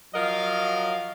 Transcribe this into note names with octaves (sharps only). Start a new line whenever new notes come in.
F3 F#3 A#4 D#5 F5